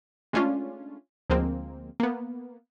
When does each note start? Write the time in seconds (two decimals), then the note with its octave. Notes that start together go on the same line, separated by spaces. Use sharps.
0.33 G#3 A3 C#4 D4 F4
1.30 D2 F3 G#3 A#3 C4
2.00 A#3 B3